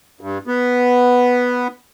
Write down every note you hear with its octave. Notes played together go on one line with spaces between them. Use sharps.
G2
B3